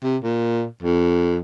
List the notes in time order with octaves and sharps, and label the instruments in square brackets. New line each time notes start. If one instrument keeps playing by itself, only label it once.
[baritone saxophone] C3
A#2
F2